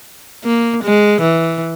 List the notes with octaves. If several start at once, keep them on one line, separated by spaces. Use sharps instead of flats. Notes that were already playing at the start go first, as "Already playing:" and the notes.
A#3
G#3
E3